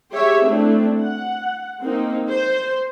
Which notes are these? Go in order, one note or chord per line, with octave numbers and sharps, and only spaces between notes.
G4 G#4 C#5 E5
A3 C4 D4 E4
F#5
A#3 C4 D#4
C5